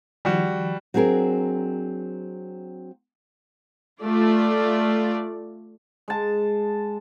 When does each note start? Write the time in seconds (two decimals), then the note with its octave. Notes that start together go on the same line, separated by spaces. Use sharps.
0.25 D#3 F3 G3 F#4
0.94 F#3 C4 D4 G#4 A#4
4.01 A3 F4 D5
6.08 G#3 A5